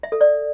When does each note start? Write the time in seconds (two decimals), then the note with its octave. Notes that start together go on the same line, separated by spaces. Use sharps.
0.03 E5
0.12 A4
0.21 D5